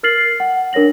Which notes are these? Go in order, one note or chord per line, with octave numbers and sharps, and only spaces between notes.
A#4 F6 A6 C7 F#7
F#5
D4 A#4 C#5 A#6 F#7